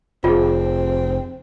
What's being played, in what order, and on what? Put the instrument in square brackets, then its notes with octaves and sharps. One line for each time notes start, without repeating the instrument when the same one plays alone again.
[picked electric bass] F1 [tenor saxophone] C4 [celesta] F4 G#4